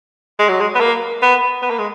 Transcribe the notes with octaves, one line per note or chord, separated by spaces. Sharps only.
G#3
F#3
G#3
B3
A#3
B3
B3
A#3
G#3